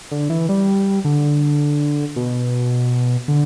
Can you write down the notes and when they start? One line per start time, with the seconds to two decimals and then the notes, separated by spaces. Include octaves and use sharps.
0.11 D3
0.30 E3
0.49 G3
1.05 D3
2.16 B2
3.28 D3